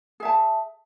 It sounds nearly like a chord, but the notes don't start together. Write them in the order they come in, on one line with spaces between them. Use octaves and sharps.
G#4 E5 A5